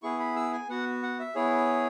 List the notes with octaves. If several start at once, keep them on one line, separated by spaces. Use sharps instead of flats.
B3 E4 G#4 C#6
B5
E6
G#5
B3 F#4 F#5
F#5
E5
B3 E4 G#4 C#5